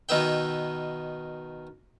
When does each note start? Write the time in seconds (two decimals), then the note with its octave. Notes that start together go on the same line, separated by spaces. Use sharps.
0.09 B2 D#3 B3 B4 E5 G5